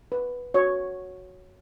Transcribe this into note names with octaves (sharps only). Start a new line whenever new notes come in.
B4
F#4 C#5